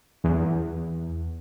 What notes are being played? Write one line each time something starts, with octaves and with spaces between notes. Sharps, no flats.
E2